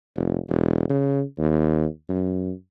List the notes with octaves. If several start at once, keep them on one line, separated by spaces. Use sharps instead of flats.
F1
E1
C#3
D#2
F#2